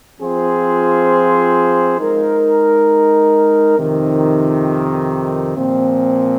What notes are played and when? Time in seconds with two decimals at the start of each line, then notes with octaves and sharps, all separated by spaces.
0.20 F3 C4 F4 G#4 C5
1.99 G#3 D#4 A#4
3.77 F2 C3 D#3
5.55 A#2 F3 C4